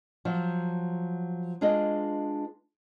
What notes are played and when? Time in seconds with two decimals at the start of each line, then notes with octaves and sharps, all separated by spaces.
0.25 F3 F#3
1.61 G#3 D4 F4 G#4 B4 D#5